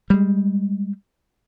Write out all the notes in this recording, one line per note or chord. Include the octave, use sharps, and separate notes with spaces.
G3 G#3